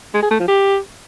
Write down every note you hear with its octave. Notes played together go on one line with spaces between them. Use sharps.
G#3
G#4
A3
F3
G4